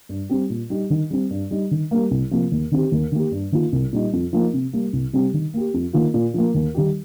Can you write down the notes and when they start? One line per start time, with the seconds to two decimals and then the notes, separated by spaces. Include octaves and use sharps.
0.09 G2
0.29 G3 C4 G4
0.50 A#2
0.70 G3 D#4 G4
0.90 D#3
1.11 G3 C4
1.30 G2
1.51 G3 D#4
1.71 D#3
1.91 G3 A#3
2.11 C2
2.31 C3 F3 A#3 F4
2.52 D#2
2.71 D#3 C4 G4
2.92 D#2
3.12 D#3 A#3 G4
3.32 G2
3.52 D#3 A#3 F4
3.72 C2
3.92 A#2 G3 D#4
4.13 F2
4.33 F3 A#3 D#4
4.53 C3
4.73 G3 A#3
4.93 C2
5.13 C3 G3 C4 G4
5.34 D#3
5.54 A#3 G4
5.74 F2
5.93 D#3 A#3 F4
6.14 A#2
6.34 F3 A#3
6.54 D#2
6.75 D#3 G3 D#4 G4